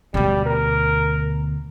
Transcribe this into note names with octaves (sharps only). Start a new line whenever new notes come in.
D2 B2 G3
A#4